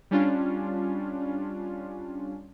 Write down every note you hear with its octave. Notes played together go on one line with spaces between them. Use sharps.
G3 C#4 D4 F4